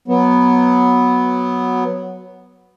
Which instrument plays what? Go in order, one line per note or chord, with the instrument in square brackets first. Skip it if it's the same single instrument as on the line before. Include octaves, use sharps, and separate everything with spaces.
[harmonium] F#3 B3